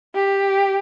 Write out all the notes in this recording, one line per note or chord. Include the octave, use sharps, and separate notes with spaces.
G4